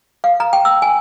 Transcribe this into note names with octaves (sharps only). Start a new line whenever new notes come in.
F5
A#5
G5
E6
G#5